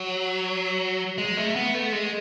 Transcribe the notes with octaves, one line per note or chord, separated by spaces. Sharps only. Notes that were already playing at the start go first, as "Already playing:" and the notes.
Already playing: F#3
G#3
A3
B3
A3
G#3